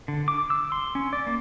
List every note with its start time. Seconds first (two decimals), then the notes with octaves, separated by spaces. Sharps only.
0.08 D3
0.28 D6
0.50 E6
0.72 C6
0.95 C#4
1.13 D5
1.27 A#3